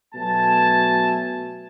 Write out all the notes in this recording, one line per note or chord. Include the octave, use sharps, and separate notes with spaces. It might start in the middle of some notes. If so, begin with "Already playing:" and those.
B2 F#3 A3 G#5 A5